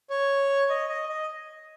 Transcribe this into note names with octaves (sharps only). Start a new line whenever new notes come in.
C#5
D#5
D#5
D#5